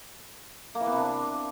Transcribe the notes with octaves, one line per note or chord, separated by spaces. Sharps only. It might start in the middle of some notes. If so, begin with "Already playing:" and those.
A#3
E3
B3
C3
D4